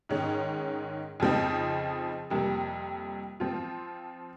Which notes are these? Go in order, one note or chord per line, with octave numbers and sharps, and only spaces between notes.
G#2 D#3 G#3 C#4
F2 C#3 F3 C4 D#4
F2 C3 G3 A#3
F3 C4 F4